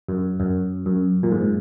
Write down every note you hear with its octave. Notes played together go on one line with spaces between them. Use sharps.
F#2
F#2
F#2
A#2
G#2